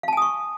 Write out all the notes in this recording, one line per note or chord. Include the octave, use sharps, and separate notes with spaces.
F5 G#5 A5 C#6 D#6